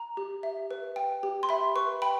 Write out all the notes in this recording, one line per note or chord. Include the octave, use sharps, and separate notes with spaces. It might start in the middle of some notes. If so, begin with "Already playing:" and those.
Already playing: A#5
G4
E5
B4
G5
G4
C6
E5 B5
B4 C#6
G5 B5